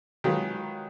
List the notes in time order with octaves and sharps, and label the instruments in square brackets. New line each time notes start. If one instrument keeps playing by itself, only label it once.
[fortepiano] D#3 F#3 G#3 F4 B4